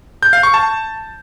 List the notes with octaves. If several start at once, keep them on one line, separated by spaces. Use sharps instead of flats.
G6
F5
C#6
A5